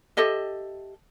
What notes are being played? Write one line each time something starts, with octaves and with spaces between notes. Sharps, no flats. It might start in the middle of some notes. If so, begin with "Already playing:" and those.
G4 A4 D#5 E5